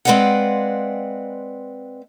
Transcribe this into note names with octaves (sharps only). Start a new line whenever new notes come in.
G#3 C4 B4 D5 F5 F#5